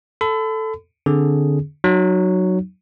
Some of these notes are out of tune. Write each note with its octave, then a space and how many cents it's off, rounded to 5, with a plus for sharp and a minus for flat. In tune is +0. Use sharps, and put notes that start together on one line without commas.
A4 +0 B5 +40
D3 +0 C4 +5 G#4 +0
F#3 +0 D#4 -30